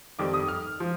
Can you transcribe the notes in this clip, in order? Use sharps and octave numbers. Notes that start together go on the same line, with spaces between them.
F2 D#3 G3 D6
D#6
F6
F3